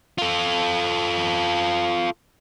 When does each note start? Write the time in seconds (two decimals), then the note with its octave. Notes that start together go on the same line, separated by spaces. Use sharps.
0.18 F4 A4